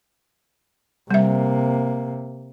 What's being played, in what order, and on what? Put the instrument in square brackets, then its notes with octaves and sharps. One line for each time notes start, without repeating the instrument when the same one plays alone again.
[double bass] C3 A#3 [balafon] G3 E5